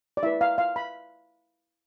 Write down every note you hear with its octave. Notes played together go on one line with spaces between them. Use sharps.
D5
E4 B4 E5
F5
F5
B5